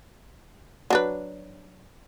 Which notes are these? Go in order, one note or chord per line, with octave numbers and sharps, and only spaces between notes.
F#3 D4 B4